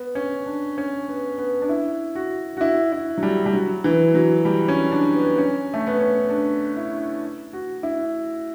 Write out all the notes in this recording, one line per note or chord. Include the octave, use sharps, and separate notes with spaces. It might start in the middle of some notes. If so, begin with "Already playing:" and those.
Already playing: B3
C#4
D4
C#4
B3
B3
D4
E4
F#4
F#4
E4
E4
F#3
G3
G3
F#3
E3
F#3
G3
C#4
D4
B3
C#4
A3
B3
C#4
D4
E4
F#4
E4